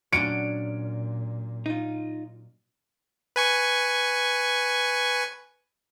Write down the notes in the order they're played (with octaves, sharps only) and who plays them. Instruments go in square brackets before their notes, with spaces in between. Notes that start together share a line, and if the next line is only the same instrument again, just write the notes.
[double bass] A#2 [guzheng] F#3 C#4 D4 [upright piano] C#7 D7
[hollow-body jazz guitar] D#4 F4
[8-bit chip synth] B4 G#5 C#6